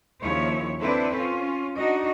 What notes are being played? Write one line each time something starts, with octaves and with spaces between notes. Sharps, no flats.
D#2 C#3 F3 E4 C#5
C4 D4 E4 A4 B4 C5
C#4 F4
D4 D#4 F#4 D#5